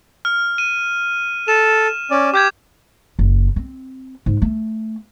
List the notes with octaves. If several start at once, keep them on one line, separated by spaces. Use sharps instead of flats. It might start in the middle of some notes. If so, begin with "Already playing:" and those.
F6
D#7
A4 E7
C#4 D5
G4 D6 G6 G#6
F#1
C4
G#2
A3